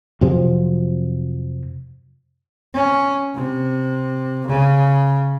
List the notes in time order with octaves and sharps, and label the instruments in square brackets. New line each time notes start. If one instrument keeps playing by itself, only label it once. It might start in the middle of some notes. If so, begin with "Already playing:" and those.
[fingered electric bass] F2 C3 F3 F#3
[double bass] C#4
C3
C#3